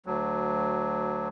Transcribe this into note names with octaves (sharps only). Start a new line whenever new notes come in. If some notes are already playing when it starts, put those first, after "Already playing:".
D2 F#3